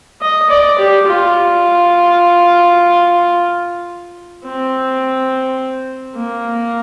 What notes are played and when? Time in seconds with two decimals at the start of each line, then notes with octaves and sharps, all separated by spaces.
0.22 D#5
0.50 D5
0.79 G4
1.06 F4
4.45 C4
6.16 A#3